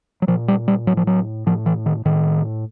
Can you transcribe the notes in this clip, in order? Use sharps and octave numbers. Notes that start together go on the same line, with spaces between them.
F#3
A#2 F3
G3
G3
A2 F#3
F3
F#3
A2 F3
E3
D#3
A2 D#3